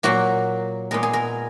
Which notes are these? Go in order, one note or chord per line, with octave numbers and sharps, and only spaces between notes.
A#2 F#3 A#3 F#4
A#2 G#3 B3 A#4
G#4
A#4